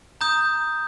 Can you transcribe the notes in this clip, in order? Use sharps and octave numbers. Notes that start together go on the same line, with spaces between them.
A#5 D#6 G6